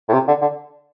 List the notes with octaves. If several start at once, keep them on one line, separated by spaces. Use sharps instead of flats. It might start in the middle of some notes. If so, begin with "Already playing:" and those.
A2
C3
D3
D3